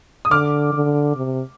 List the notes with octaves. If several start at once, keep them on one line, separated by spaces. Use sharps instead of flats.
D#6
D3 D6 F6
D3
C3